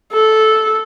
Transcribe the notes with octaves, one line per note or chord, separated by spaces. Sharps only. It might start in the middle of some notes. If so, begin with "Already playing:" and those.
A4